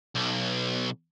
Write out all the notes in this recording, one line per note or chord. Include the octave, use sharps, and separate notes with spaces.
B1